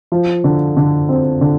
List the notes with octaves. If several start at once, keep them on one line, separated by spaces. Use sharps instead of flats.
F3
D3
D3
C4
D3